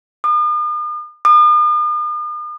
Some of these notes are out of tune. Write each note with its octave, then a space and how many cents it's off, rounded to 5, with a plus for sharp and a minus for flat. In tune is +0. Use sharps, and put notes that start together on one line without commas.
D#6 -45
D#6 -45